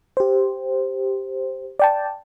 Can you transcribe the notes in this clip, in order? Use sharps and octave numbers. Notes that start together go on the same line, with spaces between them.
G4 C5
D5 G5 A5